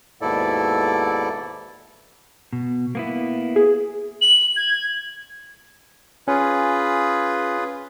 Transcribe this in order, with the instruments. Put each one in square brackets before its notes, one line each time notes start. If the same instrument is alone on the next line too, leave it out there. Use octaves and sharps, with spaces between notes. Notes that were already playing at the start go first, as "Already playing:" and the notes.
[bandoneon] D#2 G#2 B2 E4 A4 D5
[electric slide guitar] B2
A#3 B3 E4
[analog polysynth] G#4
[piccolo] F#7
G#6
[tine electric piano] C#4 [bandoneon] F4 G#4 B4